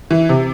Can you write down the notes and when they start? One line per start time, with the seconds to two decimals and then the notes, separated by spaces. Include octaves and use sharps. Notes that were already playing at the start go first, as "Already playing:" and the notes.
0.11 E3
0.29 C3